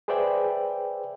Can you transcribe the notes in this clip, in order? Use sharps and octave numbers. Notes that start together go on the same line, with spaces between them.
G#4 B4 C5 D5 E5 G5